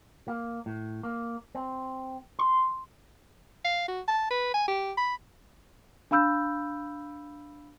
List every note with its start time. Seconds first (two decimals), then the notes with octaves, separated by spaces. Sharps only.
0.28 A#3
0.66 A2
1.03 A#3
1.55 C4
2.39 C6
3.65 F5
3.88 F#4
4.08 A5
4.31 B4
4.54 G#5
4.68 G4
4.97 B5
6.11 D4 F5 B5 E6 G6